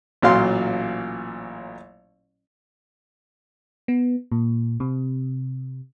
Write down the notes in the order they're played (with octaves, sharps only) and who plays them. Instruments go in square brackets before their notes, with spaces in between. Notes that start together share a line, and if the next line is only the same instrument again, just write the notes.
[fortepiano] A1 A#2 F#3 F4 F5 C6
[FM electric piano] B3
A#2
C3